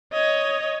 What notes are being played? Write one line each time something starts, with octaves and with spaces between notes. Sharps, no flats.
C#5 D#5